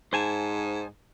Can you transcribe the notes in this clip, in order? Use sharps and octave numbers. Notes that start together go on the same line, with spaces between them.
G#2 C5 G#5 A5